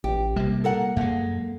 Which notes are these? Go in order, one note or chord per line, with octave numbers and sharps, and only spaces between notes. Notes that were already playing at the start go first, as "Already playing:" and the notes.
A1 G4
C3 G3 A#3
A4 A#4 F#5
F#2 G#3 A#3